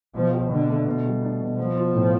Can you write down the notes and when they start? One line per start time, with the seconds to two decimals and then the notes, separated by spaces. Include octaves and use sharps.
0.14 B2 F3
0.32 G4
0.50 B2 D3
0.68 A3
0.86 B2
1.05 G3
1.23 D4
1.40 B2
1.57 F3 B3
1.76 F4
1.94 A2